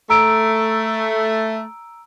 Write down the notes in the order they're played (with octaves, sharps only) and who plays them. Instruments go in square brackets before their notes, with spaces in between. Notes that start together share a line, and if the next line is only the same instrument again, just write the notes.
[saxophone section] A3 [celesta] A#5 E6 D7